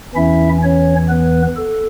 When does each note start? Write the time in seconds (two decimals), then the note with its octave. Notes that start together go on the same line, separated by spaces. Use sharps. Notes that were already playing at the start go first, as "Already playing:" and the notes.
0.15 E2 E3 C#4 E4 E5
0.62 C#4 C#5
1.09 B3 B4
1.57 A4